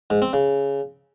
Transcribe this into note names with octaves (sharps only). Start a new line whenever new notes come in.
G#2
C4
C#3